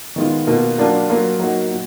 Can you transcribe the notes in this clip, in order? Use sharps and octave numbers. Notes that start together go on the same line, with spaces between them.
D#3 G#3 B3 F4
B2 A#3 F4
F#3 A#3 D4 F4
F#3 A#3 F4
F#3 A#3 D#4 F#4
A#2